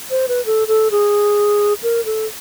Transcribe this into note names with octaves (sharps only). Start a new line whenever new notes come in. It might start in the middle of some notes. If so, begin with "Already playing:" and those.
C5
B4
A4
A4
G#4
A#4
A4